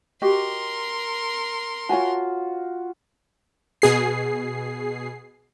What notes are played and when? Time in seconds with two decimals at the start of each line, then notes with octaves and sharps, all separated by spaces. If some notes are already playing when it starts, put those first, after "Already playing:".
0.22 F#4 G4 A#4 D#5 C6
1.89 F4 F#4 C#5 G#5 A5
3.82 B2 G#4 C7